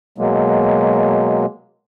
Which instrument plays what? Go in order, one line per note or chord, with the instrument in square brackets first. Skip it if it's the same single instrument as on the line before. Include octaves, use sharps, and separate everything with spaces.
[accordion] B2 F#3 G#3 A#3